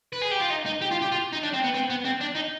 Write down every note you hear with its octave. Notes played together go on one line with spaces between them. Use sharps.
B4
G#4
G4
F4
D#4
D#4
G4
F4
G4
F4
D#4
D4
C4
B3
C4
B3
C4
D4
D#4